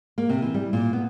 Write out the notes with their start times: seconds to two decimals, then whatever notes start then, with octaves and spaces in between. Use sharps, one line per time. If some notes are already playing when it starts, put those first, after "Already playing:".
0.18 A#3
0.29 C3
0.42 E3
0.54 G3
0.73 A#2
0.93 B3